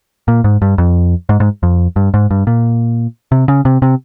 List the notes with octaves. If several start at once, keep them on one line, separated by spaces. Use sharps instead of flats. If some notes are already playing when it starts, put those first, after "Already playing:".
A#2
G#2
G2
F2
G#2
G#2
F2
G2
G#2
G2
A#2
C3
C#3
C3
C3